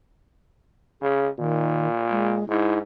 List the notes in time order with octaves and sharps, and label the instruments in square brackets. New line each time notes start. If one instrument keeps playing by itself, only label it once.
[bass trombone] C#3 [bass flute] G#4
[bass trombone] A#2 [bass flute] D#3
[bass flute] G#3
[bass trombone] G#2 [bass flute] E4